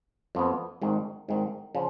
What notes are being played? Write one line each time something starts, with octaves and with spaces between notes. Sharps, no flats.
F2 F3 B3
G#1 G#2 D#3
G#1 G#2 D#3
C#3 F3